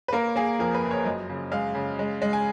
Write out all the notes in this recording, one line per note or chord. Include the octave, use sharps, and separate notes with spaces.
B4
A#3 A#4
A#3 G#4
F2 A#4
B4
F#1
C#5
F#2 D#5
C#3
G#3 F5
C#3
G#3
G#3
G#5